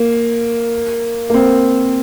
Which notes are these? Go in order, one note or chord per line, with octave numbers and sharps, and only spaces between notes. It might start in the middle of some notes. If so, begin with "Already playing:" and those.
Already playing: A#3
A#3
C4